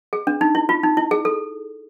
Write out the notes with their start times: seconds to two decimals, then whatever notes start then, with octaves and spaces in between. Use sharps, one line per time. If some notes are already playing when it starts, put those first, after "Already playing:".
0.13 G#4
0.27 D4
0.41 D#4
0.55 E4
0.69 F4
0.83 D#4
0.97 E4
1.11 G#4
1.25 A4